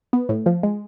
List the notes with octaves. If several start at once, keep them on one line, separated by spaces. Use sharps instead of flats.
B3
A2
F3
G#3